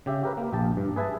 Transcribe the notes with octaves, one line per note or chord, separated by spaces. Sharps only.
C#3 G4 E5
G4 A#4 B4
A#3
A#1 G4 A5
G2
G#4 B4 E5 G#5 A5